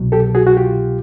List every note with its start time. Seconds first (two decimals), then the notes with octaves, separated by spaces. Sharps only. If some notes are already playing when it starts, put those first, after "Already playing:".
Already playing: C2 B2 F#3
0.12 G4 A4
0.35 F#4 G#4
0.47 F#4
0.57 F4 G4